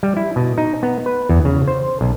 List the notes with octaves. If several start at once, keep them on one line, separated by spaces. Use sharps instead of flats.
G3
E4
B2
D#4
B3
B4
E2
C#3
C5
B1